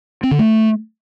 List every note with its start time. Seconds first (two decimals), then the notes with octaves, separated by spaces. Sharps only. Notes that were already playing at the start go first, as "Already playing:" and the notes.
0.23 C4
0.31 D3
0.39 A3